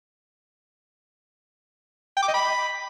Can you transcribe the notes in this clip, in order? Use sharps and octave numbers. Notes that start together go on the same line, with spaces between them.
G5
D6
D#5
B5